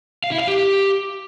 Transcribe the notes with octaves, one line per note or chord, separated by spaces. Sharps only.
F5
E4
F5
G4